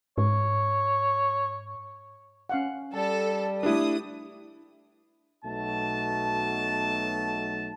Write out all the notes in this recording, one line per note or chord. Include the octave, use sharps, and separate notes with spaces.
G#2 C#5
C#4 F5 F#5
G3 A4 A5
A3 D4 E4 G4 B4 D#6
B1 B2 F#3 A3 A5